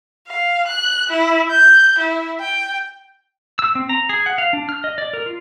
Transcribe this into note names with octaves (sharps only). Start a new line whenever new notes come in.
F5
F#6
E4
G6
E4
G5
E6
C4
A#5
G#4
F#5
F5
D4
F6
D#5
D5
A#4
F4